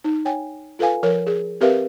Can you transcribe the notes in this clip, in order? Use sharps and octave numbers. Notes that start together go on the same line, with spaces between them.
D#4
C#5 G5 G#5
F4 A4 B4 F5 G#5
F3 A#4 C#5
G#4
C4 G4 A#4 B4 E5 F5